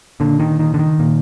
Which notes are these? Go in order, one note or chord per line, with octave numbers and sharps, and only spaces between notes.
A#2 D3
D#3
D#3
D3
D#3
A#2